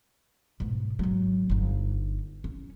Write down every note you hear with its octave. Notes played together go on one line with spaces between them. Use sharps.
G#2 B2
G#1 F#3
G1 D#4
C#4